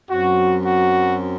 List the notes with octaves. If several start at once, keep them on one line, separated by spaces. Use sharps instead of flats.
F#2 F#3 C4 F#4
F#4